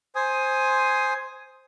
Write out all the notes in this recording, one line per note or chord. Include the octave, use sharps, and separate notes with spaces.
C5 G#5 D#6